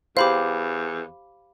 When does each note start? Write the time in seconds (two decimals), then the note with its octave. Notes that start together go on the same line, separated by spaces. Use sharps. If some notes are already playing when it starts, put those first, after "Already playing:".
0.17 E2 G4 C5 F5 B5 D6